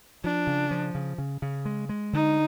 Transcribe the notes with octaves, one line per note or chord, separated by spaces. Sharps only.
F3 D4
C#3
F3
C#3
C#3
C#3
G#3
G#3
D3 D#4